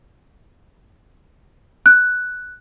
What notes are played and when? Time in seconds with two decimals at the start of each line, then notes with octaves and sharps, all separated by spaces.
1.86 F#6